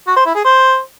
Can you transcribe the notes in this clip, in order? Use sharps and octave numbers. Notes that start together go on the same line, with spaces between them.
F#4
C5
E4
G#4
C5